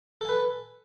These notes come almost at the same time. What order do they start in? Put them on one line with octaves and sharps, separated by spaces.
A4 G#5 B4